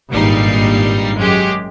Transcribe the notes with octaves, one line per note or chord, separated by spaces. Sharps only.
G#1 G2 A#2 G3 D#4 C7
F#2 G#3 G4